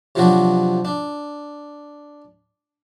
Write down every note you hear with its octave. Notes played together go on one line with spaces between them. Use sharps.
C3 F3 F#3 D4 F#4
D4